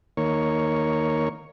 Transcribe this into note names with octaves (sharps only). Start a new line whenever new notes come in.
D#3 A#3 C#5